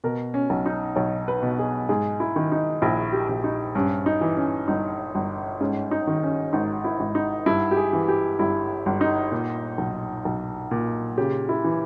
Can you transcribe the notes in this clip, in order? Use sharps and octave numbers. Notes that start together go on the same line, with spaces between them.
B2 A#4
C#4
B1
D#4
B1 C#5
B4
B2
G#4
G#2 G#4
E4
D#3
D#4
A#1 E4
G4
A#1
D#4
G2 C#4
D#4
E3
C#4
G1 D#4
G1
G#2 C#4
D#4
D#3
C#4
G#1 D#4
E4
G#1
D#4
G2 E4
G4
G#4
E3
G4
G1 E4
G1
D#4
A#2
B1
B1
A#2
C#3 G4
E4
E3